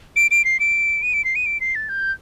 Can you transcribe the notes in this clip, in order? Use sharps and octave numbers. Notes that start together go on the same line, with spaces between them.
D7
D7
C7
D7
D#7
D7
C7
D#7
D7
C7
A6
G6